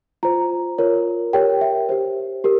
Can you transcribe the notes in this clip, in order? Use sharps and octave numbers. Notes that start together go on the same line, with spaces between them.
F4 C5 A#5
F4 A#4 C#5
G4 A#4 C#5 G5
E5
G4 C5
G4 A#4